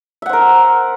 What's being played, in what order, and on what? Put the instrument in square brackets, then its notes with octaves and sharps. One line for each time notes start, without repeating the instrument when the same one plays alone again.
[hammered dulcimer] E5
F#5
C5
A#4